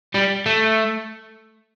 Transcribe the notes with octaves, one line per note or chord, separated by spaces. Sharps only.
G3
A3